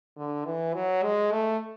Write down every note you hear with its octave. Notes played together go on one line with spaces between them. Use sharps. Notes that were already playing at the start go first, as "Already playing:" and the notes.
D3
E3
F#3
G#3
A3